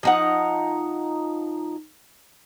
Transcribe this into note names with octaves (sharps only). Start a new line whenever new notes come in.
F3 D#4 F#5